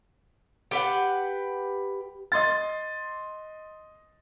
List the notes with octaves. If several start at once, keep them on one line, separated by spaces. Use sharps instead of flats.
G4 B4 F#5
D#5 C6 A6